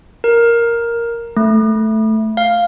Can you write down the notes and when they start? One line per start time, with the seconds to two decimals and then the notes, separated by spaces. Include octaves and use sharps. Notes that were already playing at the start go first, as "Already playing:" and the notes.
0.24 A#4
1.37 A3
2.37 F5